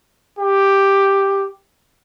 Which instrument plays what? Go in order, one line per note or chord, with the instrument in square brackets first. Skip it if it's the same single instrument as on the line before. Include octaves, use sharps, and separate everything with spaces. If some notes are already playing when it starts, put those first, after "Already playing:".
[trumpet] G4